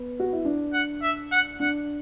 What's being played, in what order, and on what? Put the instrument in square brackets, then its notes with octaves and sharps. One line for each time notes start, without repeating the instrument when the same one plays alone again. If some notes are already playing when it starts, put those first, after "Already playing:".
Already playing: [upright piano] B3 B4
F#4
E4
D4
[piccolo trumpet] F#5
E5
F#5
[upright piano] D4 [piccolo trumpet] F#5